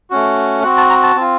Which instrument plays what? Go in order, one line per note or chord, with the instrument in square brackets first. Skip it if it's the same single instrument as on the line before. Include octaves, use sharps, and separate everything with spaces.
[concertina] A3 C#4 F#4
C4 F#4 F#5
A5
A#5
A5
C4 F4